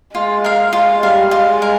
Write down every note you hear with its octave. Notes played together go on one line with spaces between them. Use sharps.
G#3 F4
A#4 F5
G#3 F4
G3 A#4 F5
G#3 F4
A#4